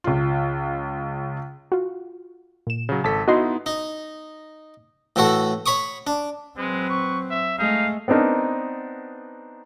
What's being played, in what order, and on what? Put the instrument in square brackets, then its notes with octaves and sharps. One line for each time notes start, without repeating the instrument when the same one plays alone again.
[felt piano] C#2 F4
[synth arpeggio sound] F4 F#4
A#2 E7
[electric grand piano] C#3 F#3
[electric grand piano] G#1 A4 [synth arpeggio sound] A5 B6
[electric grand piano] B3 D#4 E4 [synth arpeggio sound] F#4 D#5 C6
[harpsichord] D#4
A2 E3 E4 F#4 A4
C#5 B5 C#6 D#6
D4
[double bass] F#3 C4 [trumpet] G#3 [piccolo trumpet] B4
[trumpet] C#6
E5
[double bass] G#3 A3 [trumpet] D#4 [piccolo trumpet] F5
[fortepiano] B3 C4 D4 D#4 A#4